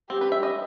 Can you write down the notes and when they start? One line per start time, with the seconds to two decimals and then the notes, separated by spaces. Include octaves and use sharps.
0.10 C4 G4
0.21 B4
0.32 E5
0.43 D#5